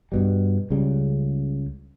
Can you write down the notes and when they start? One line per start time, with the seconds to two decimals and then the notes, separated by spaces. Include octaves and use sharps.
0.12 G2 B2 G3
0.70 C#2 C#3 G3